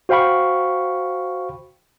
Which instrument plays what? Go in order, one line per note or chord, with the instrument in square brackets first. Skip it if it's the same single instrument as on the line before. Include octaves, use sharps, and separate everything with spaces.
[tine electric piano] F#4 C5 F5 G5 B5 C#6